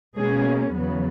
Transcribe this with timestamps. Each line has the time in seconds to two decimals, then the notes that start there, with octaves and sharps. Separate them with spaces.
0.17 B2 G#3 A#3 C#4 G#4
0.74 E2 C#3 F#3 B3